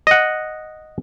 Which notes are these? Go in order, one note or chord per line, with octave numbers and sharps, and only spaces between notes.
D#5 F#5